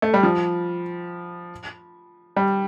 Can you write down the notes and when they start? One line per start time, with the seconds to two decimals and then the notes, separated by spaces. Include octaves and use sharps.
0.02 A3
0.14 G3
0.23 F3
2.36 G3